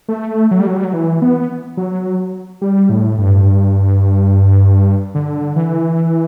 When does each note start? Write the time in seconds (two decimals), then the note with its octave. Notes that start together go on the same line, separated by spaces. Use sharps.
0.08 A3
0.51 F#3
0.60 G3
0.67 F#3
0.76 G3
0.84 F#3
0.93 E3
1.22 B3
1.77 F#3
2.62 G3
2.89 A2
3.18 G2
5.15 D3
5.56 E3